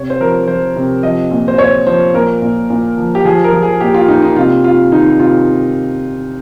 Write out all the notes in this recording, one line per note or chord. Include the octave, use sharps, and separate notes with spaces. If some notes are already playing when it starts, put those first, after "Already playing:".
Already playing: C3 C#5
C5
F3 A#4
F3 C5
C3
F3 D#5
A#2
C5
A#2 C#5
F3 C5
A#2 A#4
A#2
A#2
F3
G4
F3 G#4
A#4
F3
G#4
A#2 G4
F4
A#2 D#4
D#4
C3 F4
C3 F4
D#3 D#4
C3 F4